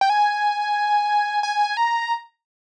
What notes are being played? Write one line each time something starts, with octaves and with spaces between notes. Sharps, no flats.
G5
G#5
G#5
A#5